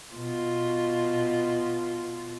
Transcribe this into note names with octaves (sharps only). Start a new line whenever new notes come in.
B2 F4